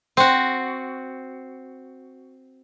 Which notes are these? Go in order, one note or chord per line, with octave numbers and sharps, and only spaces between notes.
C4 F#4